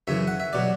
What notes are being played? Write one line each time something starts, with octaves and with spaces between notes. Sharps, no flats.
F#2 C#3 E3 E5
F#5
E5
B2 F#3 D5